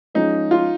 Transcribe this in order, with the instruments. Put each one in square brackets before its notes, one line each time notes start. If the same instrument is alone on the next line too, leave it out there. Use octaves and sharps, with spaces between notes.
[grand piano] F3 G#3 C#4 [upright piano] D#4
[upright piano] F4